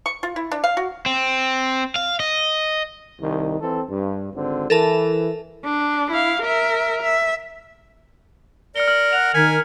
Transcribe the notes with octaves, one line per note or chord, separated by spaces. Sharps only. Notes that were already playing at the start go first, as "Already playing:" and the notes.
C#6
F4
E4
D4
F5
F#4
C4
F5
D#5
C2 D#3
E3 C4 A4
G2
G#1 D3 C4
E3 A4 A#4 A5
D4
E4 F5
A#4 E5
E5
A#4 D5 F6 C#7 G7
F6 F#7
F#5 F7
D#3 A#4 G#5 G#6 B6 C#7